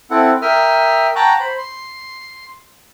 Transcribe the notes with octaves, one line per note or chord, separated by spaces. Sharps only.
C4 E4 A4 F#5
A#4 E5 G5 D#6 F6
F#5 G5 A5 A#5 C#6 F#6
C5 B5
C6